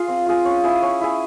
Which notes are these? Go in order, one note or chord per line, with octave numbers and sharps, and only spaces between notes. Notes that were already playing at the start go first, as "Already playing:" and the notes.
Already playing: F4 G#4
C4
F4 G#4
C#4
E4 G#4
C#4
E4 G#4